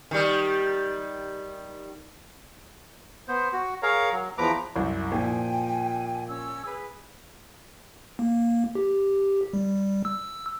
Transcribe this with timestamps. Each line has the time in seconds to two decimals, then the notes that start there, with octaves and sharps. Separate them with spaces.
0.11 D#3 G3
3.28 B3 C5
3.53 F#4
3.83 G#4 A#4 C#5 F5 A#5
4.12 F#3
4.38 E2 F3 B4 A#5 D6
4.76 C2 F#2
5.12 A#2 F3 G5 G#5
6.28 C#4 E6
6.65 G#4 B4
8.19 A#3
8.75 G4
9.53 G3
10.05 E6